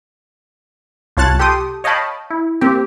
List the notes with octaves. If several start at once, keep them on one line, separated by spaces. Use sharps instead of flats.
C2 F4 C#5 A5 F#6 A6
G4 A4 G5 C6 D#6
C#5 D#5 F5 G5 A5 B5
E4
A#3 C4 G4